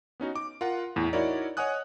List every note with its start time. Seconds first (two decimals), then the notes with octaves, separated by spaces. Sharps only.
0.20 B3 C#4 D#4 F#4
0.35 D6
0.61 F4 A#4 F#5
0.96 E2 A2
1.13 D#4 E4 F#4 A#4 C#5 D5
1.57 C#5 D#5 F#5 G#5 D#6 F#6